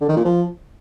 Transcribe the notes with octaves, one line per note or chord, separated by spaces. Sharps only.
D3
D#3
A#2
F3